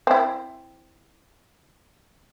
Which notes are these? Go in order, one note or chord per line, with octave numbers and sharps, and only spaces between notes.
C4 E4